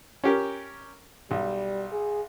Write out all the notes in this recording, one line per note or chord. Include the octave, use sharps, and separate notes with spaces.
C#4 G4 A#4
B1 G3
G#4